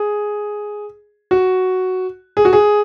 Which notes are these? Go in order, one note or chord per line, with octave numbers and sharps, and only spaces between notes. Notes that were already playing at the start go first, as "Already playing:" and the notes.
Already playing: G#4
F#4
G#4
F#4
G#4